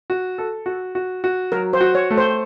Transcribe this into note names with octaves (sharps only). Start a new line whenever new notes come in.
F#4
A4
F#4
F#4
F#4
F#3 A#4
C5
F#4
C#5
A3
C5